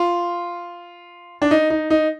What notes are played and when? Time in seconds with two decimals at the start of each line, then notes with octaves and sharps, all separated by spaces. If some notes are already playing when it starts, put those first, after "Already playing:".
Already playing: F4
1.42 D4
1.51 D#4
1.70 D#4
1.90 D#4